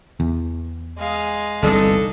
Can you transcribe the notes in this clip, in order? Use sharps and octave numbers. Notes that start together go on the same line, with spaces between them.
E2
G#3 F5
G1 C2 E3 D4 D#4 A4